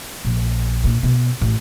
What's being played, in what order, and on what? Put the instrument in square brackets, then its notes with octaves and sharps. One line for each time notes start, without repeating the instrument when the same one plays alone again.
[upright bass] A#1
A#2
B2
A1